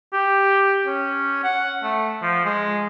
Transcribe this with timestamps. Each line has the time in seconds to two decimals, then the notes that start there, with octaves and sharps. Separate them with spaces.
0.13 G4
0.87 C#4
1.43 F#5
1.83 A3
2.22 F3
2.45 G#3